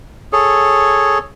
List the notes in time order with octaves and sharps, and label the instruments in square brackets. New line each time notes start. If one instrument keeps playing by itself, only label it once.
[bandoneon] G#4 A4 C#5